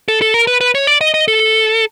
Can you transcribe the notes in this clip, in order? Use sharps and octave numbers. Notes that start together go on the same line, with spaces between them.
A4
A4
A#4
B4
B4
C#5
D5
D#5
D#5
A4